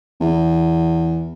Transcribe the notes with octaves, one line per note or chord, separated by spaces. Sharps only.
E2